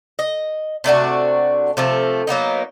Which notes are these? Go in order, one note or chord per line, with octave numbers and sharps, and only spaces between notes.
D#5
C3 A3 D4 F#4
C3 F3 A3
F#3 A#3 B3 D#4